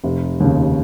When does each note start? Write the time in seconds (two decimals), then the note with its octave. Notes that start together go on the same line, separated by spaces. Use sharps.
0.04 F1
0.40 D#2 C#3